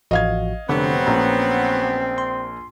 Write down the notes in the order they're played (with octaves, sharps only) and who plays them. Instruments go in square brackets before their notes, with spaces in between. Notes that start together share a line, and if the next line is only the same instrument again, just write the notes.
[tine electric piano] A1 F3 F#4 [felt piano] D#5 F5 G#6
[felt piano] F1 [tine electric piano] D3 [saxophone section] F#3 B3 [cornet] C4
[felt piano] A#1 A#5 [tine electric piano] C#4
[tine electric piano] C6